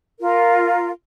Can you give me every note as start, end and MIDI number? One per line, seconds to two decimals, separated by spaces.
0.20 0.90 65
0.20 0.90 70